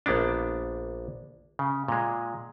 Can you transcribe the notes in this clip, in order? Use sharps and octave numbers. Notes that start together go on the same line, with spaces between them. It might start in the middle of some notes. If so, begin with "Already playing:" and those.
A#1 A#3 B3 D4
C#3
A#2 G#3